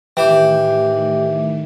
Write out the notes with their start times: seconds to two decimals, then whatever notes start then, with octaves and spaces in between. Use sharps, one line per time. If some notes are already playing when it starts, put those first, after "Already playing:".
0.17 A2 D#3 E3 G4 E5 G5 D6